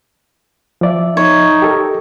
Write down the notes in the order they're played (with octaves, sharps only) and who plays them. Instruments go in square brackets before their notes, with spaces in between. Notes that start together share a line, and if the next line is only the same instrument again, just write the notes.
[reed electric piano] F3 D5 E5
[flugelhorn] D#4 [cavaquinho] C#5
[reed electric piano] G4 A4 A#4